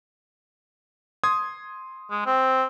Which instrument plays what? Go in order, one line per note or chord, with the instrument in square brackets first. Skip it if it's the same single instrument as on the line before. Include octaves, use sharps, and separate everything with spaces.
[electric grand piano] C6 D#6 G#6
[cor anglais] G#3
C4